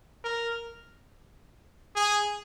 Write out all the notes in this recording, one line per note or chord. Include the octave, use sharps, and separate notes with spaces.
A#4
G#4